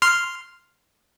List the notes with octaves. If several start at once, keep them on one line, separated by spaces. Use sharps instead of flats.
C6 F6